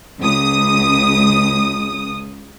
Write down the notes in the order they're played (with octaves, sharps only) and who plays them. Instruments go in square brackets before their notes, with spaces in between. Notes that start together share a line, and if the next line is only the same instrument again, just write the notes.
[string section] C#2 D#6